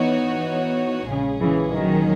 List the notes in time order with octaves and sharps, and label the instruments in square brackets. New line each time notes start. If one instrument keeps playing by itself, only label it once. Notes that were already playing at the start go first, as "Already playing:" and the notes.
Already playing: [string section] E3 B3 D#4 F#4 C#5
[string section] A#1 A#2 G#3 C#4 G#4 [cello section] C#3
[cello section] C#3 E3
D#3 F#3